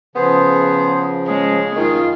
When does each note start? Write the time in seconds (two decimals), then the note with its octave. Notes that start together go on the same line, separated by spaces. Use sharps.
0.16 C#3 F3 B3 G#4 C5
1.27 G#3 C#4 G#4
1.76 F#2 D#3 F4